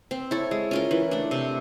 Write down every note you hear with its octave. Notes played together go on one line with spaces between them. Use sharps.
C4
E4 A4 C#5
G#3
C#4 F4 A#4
E3
A3 D4
C3